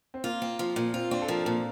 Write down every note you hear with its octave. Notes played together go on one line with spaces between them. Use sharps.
C4
A#3 F4
C4
F3
A#2
C4 F4
C4 D4
A4
F3 A#4
A#2 A4